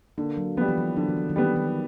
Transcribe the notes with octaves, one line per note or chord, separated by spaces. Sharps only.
D3 A#3
F#3
F3 G3 B3
E3
F3
D3 F#3
E3
F3
D#3
E3 G3 B3
D#3